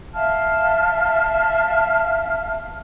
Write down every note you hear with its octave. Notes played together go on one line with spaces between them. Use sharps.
E5 F5 A5 F6